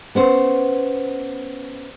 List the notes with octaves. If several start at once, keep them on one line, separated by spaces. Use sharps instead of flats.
B3 C#4 C5